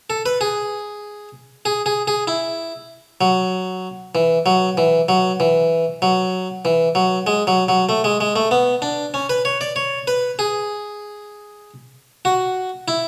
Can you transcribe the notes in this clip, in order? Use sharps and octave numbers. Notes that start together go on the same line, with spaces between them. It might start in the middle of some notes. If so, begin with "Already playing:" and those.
A4
B4
G#4
G#4
G#4
G#4
E4
F#3
E3
F#3
E3
F#3
E3
F#3
E3
F#3
G#3
F#3
F#3
A3
G#3
G#3
A3
B3
D4
C#4
B4
C#5
D5
C#5
B4
G#4
F#4
E4